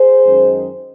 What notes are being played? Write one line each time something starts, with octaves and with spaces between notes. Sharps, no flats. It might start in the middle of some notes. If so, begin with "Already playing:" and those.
Already playing: G#4 C5
F#2 D#3 G#3